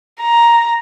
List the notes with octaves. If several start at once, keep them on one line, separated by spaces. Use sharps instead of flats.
A#5